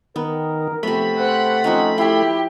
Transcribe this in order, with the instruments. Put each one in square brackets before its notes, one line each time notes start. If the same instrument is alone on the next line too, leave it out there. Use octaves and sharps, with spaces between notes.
[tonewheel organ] D#3 [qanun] B3 [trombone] A#4
[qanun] C3 B3 [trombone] F3 [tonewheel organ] A3 B5
[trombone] C5 [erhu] F#5
[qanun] F3 C4 C#4 [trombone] D#4
[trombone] E4 [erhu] G4 [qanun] C#5 C6